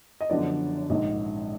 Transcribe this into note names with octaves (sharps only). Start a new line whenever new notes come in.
D#5
F#1 F#2 D3 F3 B3 D5
A#1 G#2 D#3 D#5